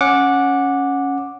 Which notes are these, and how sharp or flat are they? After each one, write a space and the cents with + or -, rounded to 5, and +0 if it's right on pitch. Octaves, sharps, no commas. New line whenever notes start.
C#4 +0 F#5 -15 D6 +0